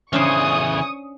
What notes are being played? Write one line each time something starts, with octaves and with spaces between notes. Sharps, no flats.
C#3 E3 C#4 D4 C5 C#6 D#6